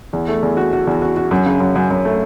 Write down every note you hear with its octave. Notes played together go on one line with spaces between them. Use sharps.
E2
A3
E2
F#4
F#4
E2
F#4
F#4
F#2
C#3
F#2
F#2
F#2
A3